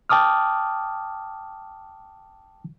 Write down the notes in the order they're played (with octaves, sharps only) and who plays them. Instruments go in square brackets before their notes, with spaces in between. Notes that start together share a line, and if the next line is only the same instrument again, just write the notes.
[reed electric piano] G5 A5 D6 D#6 F6